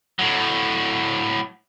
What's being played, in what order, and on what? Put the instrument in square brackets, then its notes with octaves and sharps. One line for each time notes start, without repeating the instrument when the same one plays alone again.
[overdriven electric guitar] A2 F#3